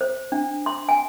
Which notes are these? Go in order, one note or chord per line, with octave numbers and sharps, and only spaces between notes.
C5
D4
C6
G#5